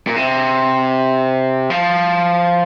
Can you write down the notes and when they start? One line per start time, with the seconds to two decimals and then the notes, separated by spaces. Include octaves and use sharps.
0.07 A#2
0.16 C3
1.70 F3